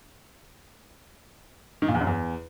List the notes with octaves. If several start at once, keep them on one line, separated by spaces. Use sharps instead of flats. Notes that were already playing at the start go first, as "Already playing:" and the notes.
D#3
A#2
E2
F#2
E2